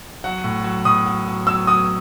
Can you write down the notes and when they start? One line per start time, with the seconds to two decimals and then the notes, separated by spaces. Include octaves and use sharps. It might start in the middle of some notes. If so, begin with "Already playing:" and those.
0.24 F#3 F#5
0.44 A2
0.64 F#3
0.85 A2 D#6
1.06 F#3
1.27 F#3
1.47 F#3 E6
1.67 F#3 D#6